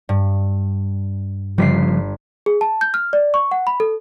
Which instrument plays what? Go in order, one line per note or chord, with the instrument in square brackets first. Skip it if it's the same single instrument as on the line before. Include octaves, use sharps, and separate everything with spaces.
[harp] G2
[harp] G1 B6 C7 [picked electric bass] C#3 F3 G3
[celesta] G#4
A5
G6
F6
D5
C#6
F#5
B5
A4